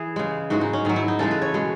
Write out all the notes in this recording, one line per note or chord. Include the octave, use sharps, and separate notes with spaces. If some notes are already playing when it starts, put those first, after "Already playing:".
Already playing: E3 G#4
C#3 G#3
G#2 E3 G#3 F#4
D#4
C#4
G#2 D#3 F#3
E4
D#4
C#3 E3 G#3 A4
B4
C#5
B2 G#3